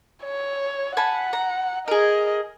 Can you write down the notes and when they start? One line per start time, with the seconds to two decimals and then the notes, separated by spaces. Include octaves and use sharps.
0.23 C#5
0.97 F#5 G#5 A5 B5
1.33 A#5
1.88 G#4 A#4 D#5